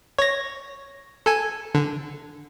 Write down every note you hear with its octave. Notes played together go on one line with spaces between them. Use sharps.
C#5 A#6
A4 G#5
D3